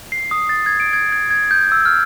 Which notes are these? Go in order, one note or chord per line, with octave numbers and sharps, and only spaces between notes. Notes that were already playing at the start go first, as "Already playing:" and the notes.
C7
D#6
A6
G#6
D7
G#6
G#6
G#6
G6
E6
F6